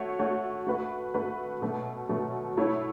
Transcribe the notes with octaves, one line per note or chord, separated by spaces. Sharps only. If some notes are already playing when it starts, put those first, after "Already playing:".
Already playing: A3 F#4 C#5
A3 F#4 C#5
A3 F#4 B4
A3 F#4 B4
B2 F#3 A3
B2 F#3 A3
A3 E4 C#5